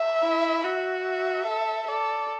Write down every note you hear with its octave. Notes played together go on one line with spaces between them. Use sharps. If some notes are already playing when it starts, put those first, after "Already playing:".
Already playing: E5
E4
F#4 E5
E5
A4
A4 D5